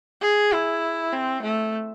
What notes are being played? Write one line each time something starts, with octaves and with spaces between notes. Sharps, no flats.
G#4
E4
C4
A3